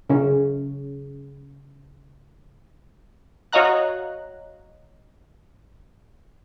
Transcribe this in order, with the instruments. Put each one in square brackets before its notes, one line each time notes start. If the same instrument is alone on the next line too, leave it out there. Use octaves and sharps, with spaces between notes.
[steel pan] C#3 C#4
[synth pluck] F#4 C#5 D#5 F5 A#5 F#6